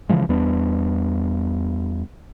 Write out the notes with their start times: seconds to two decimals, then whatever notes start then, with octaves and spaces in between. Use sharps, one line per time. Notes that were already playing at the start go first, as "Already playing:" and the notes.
0.09 C#3 E3 F3 G#3
0.29 E2 G3 B3 D4